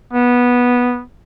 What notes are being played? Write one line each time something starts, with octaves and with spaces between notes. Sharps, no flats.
B3